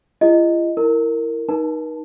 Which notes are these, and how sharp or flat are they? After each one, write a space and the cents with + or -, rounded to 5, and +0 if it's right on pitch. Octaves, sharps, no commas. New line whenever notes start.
F4 -45 G#4 -40 D#5 +0
E4 +0 A#4 -15
D#4 +0 A#4 +45 A5 +0